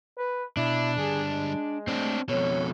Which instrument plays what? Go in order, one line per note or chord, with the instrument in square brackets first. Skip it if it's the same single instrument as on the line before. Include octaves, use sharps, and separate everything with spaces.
[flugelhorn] B4
[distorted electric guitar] B2 [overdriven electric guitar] D4 [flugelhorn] E4
[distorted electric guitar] D3 G3 [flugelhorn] G#4
[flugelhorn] G#3
[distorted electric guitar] A3 G#5 [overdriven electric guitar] C4 D4
[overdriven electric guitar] F2 B2 [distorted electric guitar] A4 [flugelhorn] C#5